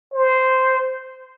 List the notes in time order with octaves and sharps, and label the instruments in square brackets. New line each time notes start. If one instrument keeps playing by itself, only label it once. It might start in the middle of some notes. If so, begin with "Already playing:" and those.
[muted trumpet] C5